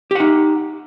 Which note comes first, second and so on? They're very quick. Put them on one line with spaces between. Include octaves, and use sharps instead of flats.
G4 F#5 D#4